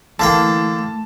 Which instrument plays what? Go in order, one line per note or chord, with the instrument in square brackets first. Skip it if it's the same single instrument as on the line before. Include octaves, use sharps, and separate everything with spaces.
[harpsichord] D3 A#3 G5 [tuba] E3 [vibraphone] A3 [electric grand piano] A5